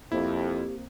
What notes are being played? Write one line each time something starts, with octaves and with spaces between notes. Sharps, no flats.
F2 A#3 C4 E4 G4